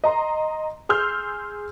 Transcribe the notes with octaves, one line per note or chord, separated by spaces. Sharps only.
D#5 A#5 C6
G#4 C6 E6 F6 G6